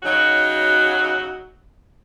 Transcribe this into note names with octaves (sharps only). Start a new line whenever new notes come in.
C#3 F#3 D#4 F#4